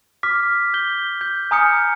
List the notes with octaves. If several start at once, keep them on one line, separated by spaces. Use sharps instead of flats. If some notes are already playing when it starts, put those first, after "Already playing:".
D6 F6 B6
G6 G7
G6
G#5 A#5 D#6 F6 G6 C#7